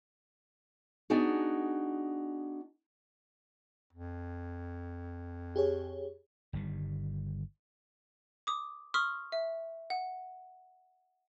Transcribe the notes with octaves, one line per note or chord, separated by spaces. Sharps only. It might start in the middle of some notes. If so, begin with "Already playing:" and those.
B3 D4 D#4 F#4 G#4
F2
G4 G#4 C#5
G1 D#3 G3
D6 D#6
C6 C#6 D#6 F6 B6
E5
F#5